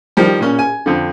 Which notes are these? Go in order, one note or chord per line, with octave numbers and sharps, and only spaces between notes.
D#3 F3 G3
A#2 C#4
G#5
F2 D3